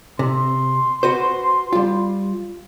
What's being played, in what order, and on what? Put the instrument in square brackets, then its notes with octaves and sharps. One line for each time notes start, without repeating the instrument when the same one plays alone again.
[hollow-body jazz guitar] C3 [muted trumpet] C6
[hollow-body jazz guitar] F#4 B4 C5
G3 F4